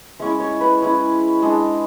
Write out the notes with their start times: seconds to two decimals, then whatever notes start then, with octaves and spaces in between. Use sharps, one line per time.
0.20 G#3 C#4 E4 E5
0.40 C#5
0.61 B4
0.82 G#3 C#4 E4
1.42 G#3 D4